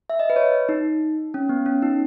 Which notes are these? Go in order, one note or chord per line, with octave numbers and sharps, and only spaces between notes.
E5
D#5
B4
C#5
D#4
C#4
B3
C#4
D#4